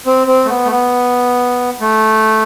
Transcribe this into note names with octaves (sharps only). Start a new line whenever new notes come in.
C4
C4
A3
B3
A3
B3
A3